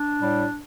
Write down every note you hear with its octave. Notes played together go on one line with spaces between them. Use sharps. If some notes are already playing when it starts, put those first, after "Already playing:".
Already playing: D4
A2 G3